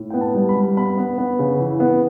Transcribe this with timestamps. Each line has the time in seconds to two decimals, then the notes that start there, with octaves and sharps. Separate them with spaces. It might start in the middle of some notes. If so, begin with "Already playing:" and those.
Already playing: A2
0.10 B3 G5
0.21 A5
0.34 G3
0.49 B5
0.56 G3
0.77 B3 B5
0.98 B3
1.18 B3
1.39 C#3
1.59 E3
1.80 B3